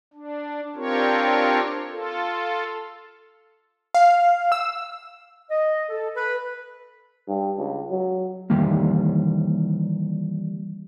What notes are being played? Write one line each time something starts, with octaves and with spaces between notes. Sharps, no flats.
D4
C4 D4 F4 G4 A#4 C#5
F4 A4
F5
E6
D#5
A4
B4
G2
C#2
F#3
D#3 E3 G3 A#3